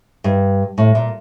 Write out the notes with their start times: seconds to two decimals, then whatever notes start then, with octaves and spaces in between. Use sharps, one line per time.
0.24 G2
0.78 A2
0.95 A#2